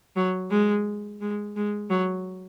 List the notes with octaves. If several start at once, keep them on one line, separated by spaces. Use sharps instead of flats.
F#3
G#3
G#3
G#3
F#3